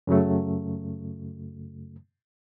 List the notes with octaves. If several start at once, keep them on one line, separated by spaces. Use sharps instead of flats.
F#2 C#3 F#3 A3